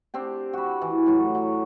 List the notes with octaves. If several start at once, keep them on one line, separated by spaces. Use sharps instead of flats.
C4 D4 G4
F#4 B5
E3
A2 F#3
F#3